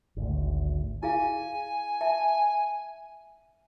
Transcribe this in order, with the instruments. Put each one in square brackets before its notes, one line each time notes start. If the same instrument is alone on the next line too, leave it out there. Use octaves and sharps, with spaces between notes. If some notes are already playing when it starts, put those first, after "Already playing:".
[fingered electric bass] G#1 D2
[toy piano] E4 G#4 F5 [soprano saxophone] G#5
[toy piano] E5 A5